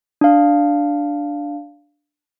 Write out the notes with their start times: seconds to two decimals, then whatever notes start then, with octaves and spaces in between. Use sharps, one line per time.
0.21 D4 F5